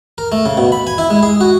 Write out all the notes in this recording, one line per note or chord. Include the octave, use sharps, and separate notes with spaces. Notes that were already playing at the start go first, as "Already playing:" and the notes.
A#4
A3
C#3
B2
B5
G#5
E4
G#3
G#4
F#4